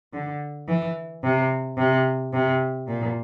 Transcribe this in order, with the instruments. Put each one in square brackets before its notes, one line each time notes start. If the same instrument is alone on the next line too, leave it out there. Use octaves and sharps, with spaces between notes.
[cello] D3
E3
C3
C3
C3
A#2